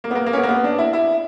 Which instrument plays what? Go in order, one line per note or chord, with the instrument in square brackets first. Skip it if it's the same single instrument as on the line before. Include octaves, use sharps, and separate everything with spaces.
[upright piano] A#3
B3
A#3
A#3
C#4
B3
A#3
B3
D4
E4
E4